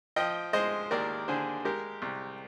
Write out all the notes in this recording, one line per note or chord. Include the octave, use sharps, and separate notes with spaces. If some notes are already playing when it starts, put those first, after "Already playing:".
F3 D#5 G5
G#3 C5 D#5
D#2 A#4 D5
D3 G#4 C5
G#3 G4 A#4
C2